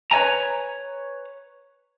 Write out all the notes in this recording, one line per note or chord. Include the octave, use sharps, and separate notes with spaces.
B4 C#5 D#5 G#5 A#5